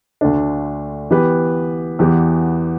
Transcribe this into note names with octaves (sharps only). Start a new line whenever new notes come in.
D2 D3 A3 D4
E3 B3 G4 B4
E2 E3 B3 G4